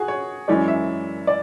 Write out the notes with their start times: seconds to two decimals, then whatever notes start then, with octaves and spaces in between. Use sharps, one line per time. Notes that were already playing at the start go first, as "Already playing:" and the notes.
Already playing: F#4 G#4
0.08 C#5
0.48 F#2 E3 G#3 C#4 D5
0.68 E5
1.27 D5